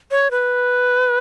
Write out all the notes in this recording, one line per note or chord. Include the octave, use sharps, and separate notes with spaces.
C#5
B4